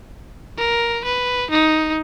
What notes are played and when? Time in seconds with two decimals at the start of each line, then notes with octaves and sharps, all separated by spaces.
0.58 A#4
1.05 B4
1.51 D#4